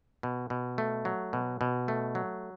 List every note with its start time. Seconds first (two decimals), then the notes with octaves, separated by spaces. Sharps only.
0.23 B2
0.50 B2
0.78 A3
1.05 F#3
1.33 B2
1.61 B2
1.88 A3
2.15 F#3